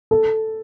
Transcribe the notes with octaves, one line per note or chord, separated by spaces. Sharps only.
A4